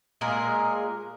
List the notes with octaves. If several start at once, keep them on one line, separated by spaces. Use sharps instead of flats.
A#2 G#3 G#4 A#4